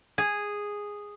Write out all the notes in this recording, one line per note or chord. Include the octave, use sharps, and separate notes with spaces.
G#4